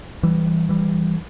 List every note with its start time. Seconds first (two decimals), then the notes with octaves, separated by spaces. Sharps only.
0.23 E3 G3
0.69 E3 G3